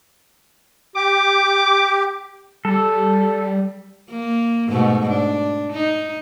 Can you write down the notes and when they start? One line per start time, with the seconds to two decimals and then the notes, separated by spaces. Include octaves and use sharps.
0.95 G4 D6
2.65 G3 A4
4.10 A#3
4.68 G#2 B2 A3
5.10 D4
5.72 D#4